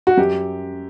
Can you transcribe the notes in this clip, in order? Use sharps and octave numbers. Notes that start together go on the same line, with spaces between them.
F#4
F#2 G4